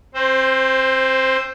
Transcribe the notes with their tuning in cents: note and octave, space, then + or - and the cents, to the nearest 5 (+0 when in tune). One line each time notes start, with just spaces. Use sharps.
C4 +25 C5 +0